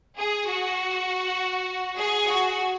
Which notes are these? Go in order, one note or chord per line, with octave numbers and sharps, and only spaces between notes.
G#4
F#4
G#4
F#4